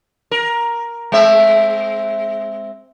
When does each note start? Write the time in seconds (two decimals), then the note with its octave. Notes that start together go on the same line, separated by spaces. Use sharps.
0.31 A#4
1.12 G#3 C4 E5